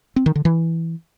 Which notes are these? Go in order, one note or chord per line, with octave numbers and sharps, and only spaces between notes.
C4
D#3
D3
E3